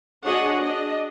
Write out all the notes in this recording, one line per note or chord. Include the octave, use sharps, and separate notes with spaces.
D4 F#4 G#4 C#5 D#5 F#5
D4 D#5